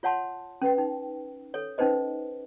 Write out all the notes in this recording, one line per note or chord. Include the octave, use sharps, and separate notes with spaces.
F4 C#5 F#5 A5 C6
C#4 B4 G5
D#4
A4 C#5
C#4 D#4 B4 C5 D#5